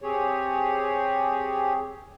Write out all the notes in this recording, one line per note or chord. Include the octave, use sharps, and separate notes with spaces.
C4 G4 G#4 C#5